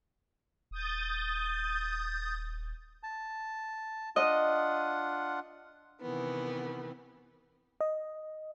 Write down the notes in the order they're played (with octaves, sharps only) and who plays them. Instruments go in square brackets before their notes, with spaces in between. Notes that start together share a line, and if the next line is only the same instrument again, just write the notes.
[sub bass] D#1 [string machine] D#6 G6 A6
[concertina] A5
[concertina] D4 F4 F#5 [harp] D#5
[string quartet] C3 D#3 E3 B3
[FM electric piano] D#5